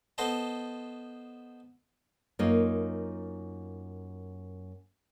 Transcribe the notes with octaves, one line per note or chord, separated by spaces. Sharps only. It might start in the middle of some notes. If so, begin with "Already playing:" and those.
B3 A4 C5 D#5 A5
F#2 A#3 D#4 F4